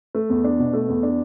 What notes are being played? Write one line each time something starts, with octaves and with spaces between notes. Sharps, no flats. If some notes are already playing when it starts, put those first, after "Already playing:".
A3
E2
D4
B2
A3
E2
D4